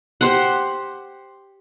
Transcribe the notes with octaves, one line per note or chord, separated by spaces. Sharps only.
G4 C5 F#5